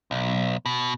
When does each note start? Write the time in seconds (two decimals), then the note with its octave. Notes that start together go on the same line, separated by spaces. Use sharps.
0.11 B1
0.66 B2